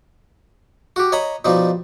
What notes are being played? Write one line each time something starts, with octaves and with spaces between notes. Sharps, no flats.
F#4 G4
C#5 D#5 A#5 B5
B2 F3 G3 D#4